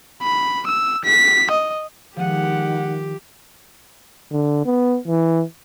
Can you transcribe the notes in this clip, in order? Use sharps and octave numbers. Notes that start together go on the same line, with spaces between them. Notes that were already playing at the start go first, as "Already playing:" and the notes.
B5
E6
B6
D#5
D#3 F3 G#3 G4 F#5 D#7
D3
B3
E3